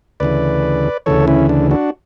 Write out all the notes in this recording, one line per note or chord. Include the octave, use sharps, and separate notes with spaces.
D2 C#3 E3 B4 D5
D2 C#3 E3 A4 C#5
C#4 E4
D4
D4 F#4